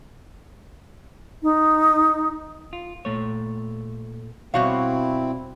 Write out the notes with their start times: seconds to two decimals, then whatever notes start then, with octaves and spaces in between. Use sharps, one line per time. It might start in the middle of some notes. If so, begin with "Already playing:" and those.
1.43 D#4
2.73 F4
3.05 A#2 A3 C#5
4.54 B2 G3 C4 E4 F#4 C#5 F5